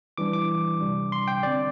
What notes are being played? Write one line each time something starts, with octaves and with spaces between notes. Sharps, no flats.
E3 G3 D4 D6
D6
C3 G3 D4
C6
G5
D3 C4 D5